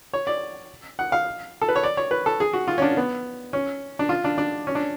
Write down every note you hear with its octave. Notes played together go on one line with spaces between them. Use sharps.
C#5
D5
F#5
F5
A4
B4
C#5
D5
C#5
B4
A4
G#4
F#4
F4
C#4
D4
B3
C#4
D4
F4
D4
D4
C#4
D4